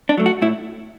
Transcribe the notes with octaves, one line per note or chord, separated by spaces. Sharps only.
D4
F#3 A3
F#4
A2 E4